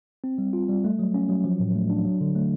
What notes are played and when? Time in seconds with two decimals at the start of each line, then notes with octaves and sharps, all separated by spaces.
0.24 C4
0.38 G3
0.53 F4
0.69 G3
0.84 A3
0.99 F#3
1.14 C#4
1.29 F#3
1.45 F3
1.60 A2
1.75 A3
1.90 D4
2.05 F#3
2.21 D3
2.35 A3